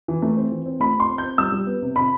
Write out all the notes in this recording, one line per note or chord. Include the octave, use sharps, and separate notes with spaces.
E3
A3
C4
E3
C4
A3 B5
C4 C6
C4
G6
C4
G3 E6
G3
B3
C3
C3 B5